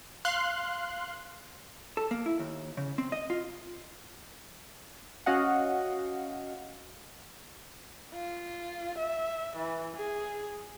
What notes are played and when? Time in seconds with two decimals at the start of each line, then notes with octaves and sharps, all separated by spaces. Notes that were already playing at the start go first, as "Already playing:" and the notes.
0.25 F5 C6 F#6
1.97 A4
2.11 A#3
2.26 E4
2.39 D#2
2.77 C#3
2.98 C4
3.12 D#5
3.30 F4
5.26 C#4 F#4 D#5 F5 F#5
8.14 F4
8.99 E5
9.57 E3
9.97 G#4